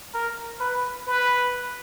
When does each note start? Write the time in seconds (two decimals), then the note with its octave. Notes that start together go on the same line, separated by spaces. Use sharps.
0.14 A#4
0.60 B4
1.07 B4